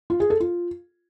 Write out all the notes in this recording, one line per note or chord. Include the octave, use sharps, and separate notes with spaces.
F4
G#4
A4
F4